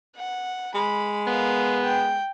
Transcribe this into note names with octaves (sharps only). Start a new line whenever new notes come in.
F#5
G#3 B5
B3 A#4 F5
G5